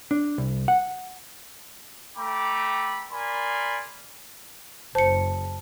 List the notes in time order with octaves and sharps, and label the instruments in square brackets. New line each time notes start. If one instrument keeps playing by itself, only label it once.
[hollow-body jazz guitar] D4
C2
F#5
[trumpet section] A3 G5 A#5 B5 D6
A#4 D5 G#5 B5 C6
[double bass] F#1 [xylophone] C5 C#7 [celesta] A5